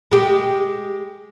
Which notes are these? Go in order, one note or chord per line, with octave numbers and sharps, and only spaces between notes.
G#3 G4